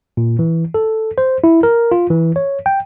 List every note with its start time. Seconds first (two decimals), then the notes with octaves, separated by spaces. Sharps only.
0.17 A#2
0.39 E3
0.74 A4
1.18 C5
1.44 E4
1.63 A#4
1.91 F4
2.10 E3
2.36 C#5
2.66 G5